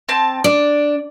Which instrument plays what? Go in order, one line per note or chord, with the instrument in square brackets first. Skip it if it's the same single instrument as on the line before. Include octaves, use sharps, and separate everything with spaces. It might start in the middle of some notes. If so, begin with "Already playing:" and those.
[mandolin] C4 A5
[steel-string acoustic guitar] D4 [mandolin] D5